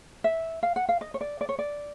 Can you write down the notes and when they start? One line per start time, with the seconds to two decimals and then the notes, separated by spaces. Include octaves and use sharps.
0.24 E5
0.63 F5
0.76 F#5
0.89 F5
1.01 D#5
1.14 C#5
1.21 D5
1.41 D5
1.49 C#5
1.59 D5